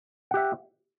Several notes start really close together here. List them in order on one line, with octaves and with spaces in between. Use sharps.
F#5 G4 E5